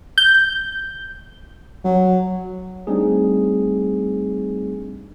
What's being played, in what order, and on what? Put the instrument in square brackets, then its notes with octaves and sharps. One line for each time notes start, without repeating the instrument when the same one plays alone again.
[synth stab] G6
[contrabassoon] F#3
[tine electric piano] G3 A3 C4 D4 D#4 G#4